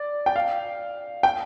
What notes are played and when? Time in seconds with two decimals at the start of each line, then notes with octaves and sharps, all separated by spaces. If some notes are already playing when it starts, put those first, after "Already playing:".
Already playing: D5
0.26 G5
0.36 F5
1.23 G5